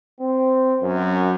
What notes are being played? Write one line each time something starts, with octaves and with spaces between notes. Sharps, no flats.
C4
F#2